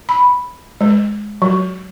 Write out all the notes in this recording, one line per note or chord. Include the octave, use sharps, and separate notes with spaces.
B5
G#3
F#3